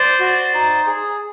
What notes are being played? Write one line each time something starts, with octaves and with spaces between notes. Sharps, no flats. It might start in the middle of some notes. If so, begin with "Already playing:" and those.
Already playing: C5 D5
F#4
D#4
G#4